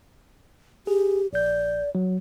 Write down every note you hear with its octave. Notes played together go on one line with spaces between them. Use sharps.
G4 G#4
A#1 D5 G6
F#3